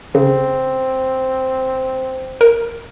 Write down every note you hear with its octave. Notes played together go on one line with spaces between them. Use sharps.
C#3 C4
A#4